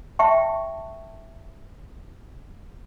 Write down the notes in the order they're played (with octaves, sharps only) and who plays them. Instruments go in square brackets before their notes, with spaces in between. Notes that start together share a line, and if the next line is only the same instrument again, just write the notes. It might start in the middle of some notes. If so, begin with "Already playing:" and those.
[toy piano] E5 G5 A5 C#6